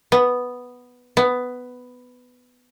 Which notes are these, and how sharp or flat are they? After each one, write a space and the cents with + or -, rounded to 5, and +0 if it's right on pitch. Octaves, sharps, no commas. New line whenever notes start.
B3 +0
B3 +10